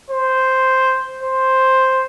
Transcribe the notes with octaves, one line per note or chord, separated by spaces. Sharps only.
C5
C5